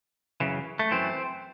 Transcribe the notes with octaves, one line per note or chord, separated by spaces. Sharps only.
F#2 C#3 E3
A3
F#2 E3 C4